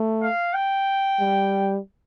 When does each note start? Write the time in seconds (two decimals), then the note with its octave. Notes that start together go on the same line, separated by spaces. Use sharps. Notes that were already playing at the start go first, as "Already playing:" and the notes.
Already playing: A3
0.22 F5
0.54 G5
1.20 G3